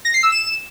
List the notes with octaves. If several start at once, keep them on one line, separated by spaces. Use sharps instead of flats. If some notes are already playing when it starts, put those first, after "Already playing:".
A#6
C7
E6
E7